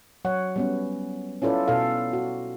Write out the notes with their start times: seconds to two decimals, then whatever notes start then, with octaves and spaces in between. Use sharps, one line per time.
0.25 F#3 C#5 F#5
0.56 G3 B3 C#4
1.42 C#4 E4 F4 A4 B4 D5
1.68 B2 A4 F5
2.13 F#4